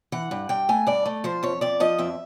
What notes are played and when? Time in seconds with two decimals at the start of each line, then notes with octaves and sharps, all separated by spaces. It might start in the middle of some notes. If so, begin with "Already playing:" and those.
0.12 E3 F#5
0.31 G2
0.49 G2 G5
0.69 A3 G#5
0.87 G2 D5
1.06 A3
1.24 F3 C5
1.43 F2 C#5
1.61 F2 D5
1.80 F3 D#5
1.99 F2 E5